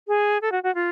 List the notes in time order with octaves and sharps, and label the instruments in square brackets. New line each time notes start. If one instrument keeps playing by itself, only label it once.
[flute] G#4
A4
F#4
F#4
F4